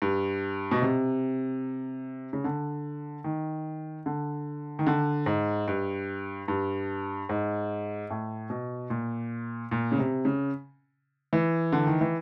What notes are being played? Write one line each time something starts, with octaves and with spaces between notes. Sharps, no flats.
G2
B2
C3
C#3
D3
D#3
D3
D#3
D3
G#2
G2
G2
G#2
A2
B2
A#2
A#2
C#3
C3
C#3
E3
D3
D#3
E3